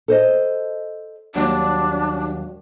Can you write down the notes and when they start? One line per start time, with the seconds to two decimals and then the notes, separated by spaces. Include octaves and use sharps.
0.08 A4 C5 D#5
1.35 D#2 F#3 G3 D4